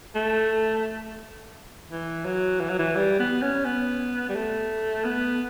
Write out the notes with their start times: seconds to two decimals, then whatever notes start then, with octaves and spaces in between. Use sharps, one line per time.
0.15 A3
1.91 E3
2.25 F#3
2.60 E3
2.70 F#3
2.79 E3
2.96 G3
3.19 B3
3.42 C#4
3.65 B3
4.29 G3
4.35 A3
5.05 B3